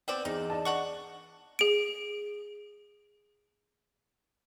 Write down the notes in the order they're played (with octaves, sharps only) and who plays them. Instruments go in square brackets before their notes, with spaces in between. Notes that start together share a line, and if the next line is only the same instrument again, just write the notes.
[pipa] B3 C4 D5 [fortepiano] G5
[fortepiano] E2 [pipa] D#4
[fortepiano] D5 D#5 A5
[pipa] D4 F#5 C#6
[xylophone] G#4 D7